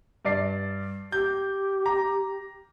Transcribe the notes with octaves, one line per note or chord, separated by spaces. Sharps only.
G2 D5 C7
G4 G6
A#5